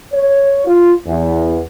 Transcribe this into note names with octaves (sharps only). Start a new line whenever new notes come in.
C#5
F4
E2